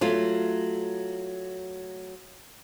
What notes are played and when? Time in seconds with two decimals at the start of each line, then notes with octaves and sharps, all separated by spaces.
0.01 F#3 A3 F4